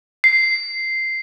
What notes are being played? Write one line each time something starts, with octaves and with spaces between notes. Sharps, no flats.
C7